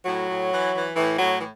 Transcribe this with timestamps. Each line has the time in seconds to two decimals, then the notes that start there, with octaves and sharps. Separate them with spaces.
0.05 A2 F#3
0.28 A2
0.52 E3
0.73 E3
0.96 A2 E3
1.18 A2 F#3
1.41 E3